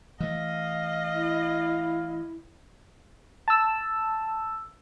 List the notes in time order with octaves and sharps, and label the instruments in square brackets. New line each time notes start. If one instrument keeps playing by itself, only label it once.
[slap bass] E3 A3 [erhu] D#5 [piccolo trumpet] F5
[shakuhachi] E4
[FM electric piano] A5 E6